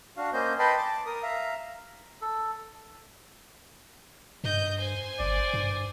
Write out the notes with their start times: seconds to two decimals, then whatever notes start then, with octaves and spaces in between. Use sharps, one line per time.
0.17 D4 F#4 F5
0.33 A#3 C#4 C5 D#5 G6
0.59 B4 D#5 G5 A5 B5 C6
0.77 A5 D6
1.06 A#4 D#6
1.23 E5 F5 A#5
2.22 A4
4.44 G2 D#5 G6
4.79 C5 G#5
5.20 G1 D5
5.54 G2